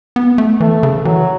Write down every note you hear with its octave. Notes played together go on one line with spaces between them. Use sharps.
B3
A3
E3 A3
C#3
E3 F#3